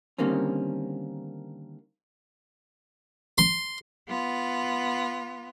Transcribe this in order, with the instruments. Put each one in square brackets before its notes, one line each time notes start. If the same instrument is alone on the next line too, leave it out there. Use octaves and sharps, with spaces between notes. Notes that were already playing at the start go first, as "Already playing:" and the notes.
[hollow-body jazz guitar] D3 D#3 G3 A#3 C4 C#4
[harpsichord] C6
[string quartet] B3 F4